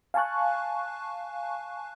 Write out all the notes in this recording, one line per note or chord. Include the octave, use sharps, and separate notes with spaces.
F5 G#5 A5 C#6 F#6